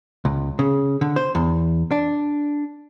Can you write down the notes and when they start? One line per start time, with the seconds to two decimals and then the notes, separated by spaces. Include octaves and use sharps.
0.25 C#2
0.59 C#3
1.01 D3
1.16 C5
1.35 E2
1.91 D4